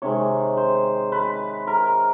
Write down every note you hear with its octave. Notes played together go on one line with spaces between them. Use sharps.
C3 D#3 G#3 C#5
C5
B4
A#4